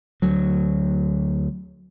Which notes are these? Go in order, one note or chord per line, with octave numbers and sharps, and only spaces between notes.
D2 F#3